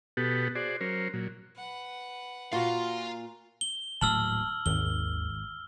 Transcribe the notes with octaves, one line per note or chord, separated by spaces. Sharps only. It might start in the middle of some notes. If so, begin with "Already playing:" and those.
B2 B3 F#4 G4 A4
F#4 G#4 C5 D5
F#3 C#4 A#4 C5
A#2 F#3
B4 F#5
A#2 F4 F#4 F5 C6
G7
D#1 A2 F#3 A5 E6 F6 F#7
G#1 D#2 G7